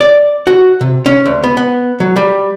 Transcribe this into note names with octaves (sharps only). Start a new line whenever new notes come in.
D5
F#4
C3
C#4
D2
B3
B3
F#3
G3